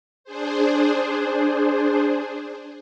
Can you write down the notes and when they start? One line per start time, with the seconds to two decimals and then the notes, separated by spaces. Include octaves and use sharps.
0.24 D4 G#4 C5